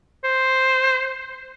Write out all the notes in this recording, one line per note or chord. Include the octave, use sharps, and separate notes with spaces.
C5